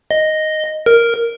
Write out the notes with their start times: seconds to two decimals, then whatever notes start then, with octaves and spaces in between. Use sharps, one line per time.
0.11 D#5
0.86 A#4